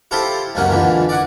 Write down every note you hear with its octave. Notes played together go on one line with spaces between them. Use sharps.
E4 F4 G4 A4 C5
C#2 F#2 C3 A#3 C#4 F#5
F2 A#2 D3 E3
D5 F#5 G#5